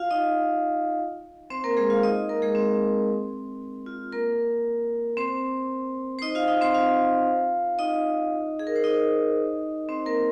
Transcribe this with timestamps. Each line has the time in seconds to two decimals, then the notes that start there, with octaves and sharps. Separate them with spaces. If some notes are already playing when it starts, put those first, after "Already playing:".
Already playing: F4 F5
0.11 D#4 D#5
1.50 C4 C5
1.64 A#3 A#4
1.77 G#3 G#4
1.90 F4 F5
2.03 D#4 D#5
2.29 A#3 A#4
2.42 G#3 G#4
2.55 C4
3.86 F4
4.12 A#3 A#4
5.17 C4 C5
6.19 C5
6.22 D#4 D#5
6.35 F4 F5
6.48 D#4 D#5
6.61 C4 C5
6.74 F4 F5
7.79 D#4 D#5
8.59 G#4
8.67 A#4
8.76 C5
8.84 D#4 D#5
9.89 C4 C5
10.06 A#3 A#4